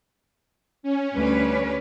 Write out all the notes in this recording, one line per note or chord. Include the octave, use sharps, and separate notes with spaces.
C#4
D2 G3 B4